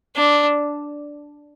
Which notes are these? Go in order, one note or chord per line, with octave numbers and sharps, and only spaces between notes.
D4